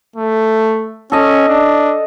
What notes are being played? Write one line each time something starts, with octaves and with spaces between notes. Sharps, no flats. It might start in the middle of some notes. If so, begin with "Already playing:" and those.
A3
C#4 A4 D#5
D4